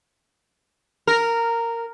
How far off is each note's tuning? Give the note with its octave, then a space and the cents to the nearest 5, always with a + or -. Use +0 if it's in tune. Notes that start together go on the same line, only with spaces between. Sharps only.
A#4 -10